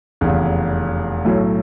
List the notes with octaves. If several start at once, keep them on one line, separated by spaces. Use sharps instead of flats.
F1 E2 C#3
B1 A2 F#3 A3